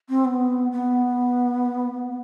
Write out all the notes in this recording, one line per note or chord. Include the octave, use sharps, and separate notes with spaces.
C4
B3
B3